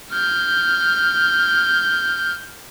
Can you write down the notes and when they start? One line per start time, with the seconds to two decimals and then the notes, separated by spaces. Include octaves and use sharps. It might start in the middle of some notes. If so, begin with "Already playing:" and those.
0.11 F6 G6